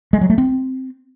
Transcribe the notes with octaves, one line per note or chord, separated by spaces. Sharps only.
G#3
F#3
A3
C4